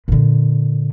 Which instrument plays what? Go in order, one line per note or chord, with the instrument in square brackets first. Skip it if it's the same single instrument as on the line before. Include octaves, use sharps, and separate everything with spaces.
[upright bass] A#2 D3